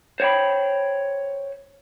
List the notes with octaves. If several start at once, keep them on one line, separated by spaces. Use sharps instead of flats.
C5 C#5 F#5 G5 B5